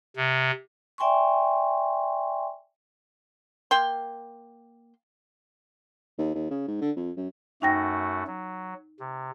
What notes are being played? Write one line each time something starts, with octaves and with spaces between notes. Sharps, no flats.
C3
D5 E5 G5 G#5 C6 C#6
A#3 G5 C6
D#2
D#2
C#3
G#2
D3
F2
F#2
F#2 A3 D#4 F#4 G5 A#6
F#3
C3